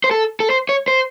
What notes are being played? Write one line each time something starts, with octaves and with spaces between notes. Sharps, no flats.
C5
A4
A4
C5
C#5
C5